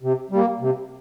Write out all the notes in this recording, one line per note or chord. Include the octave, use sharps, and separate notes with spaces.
C3
G3 A#3
C3